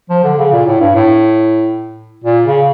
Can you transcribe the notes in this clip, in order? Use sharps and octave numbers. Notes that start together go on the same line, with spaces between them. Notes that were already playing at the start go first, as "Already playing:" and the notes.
F3
D3
C#3
A#2
A2
G2
A2
A#2
C#3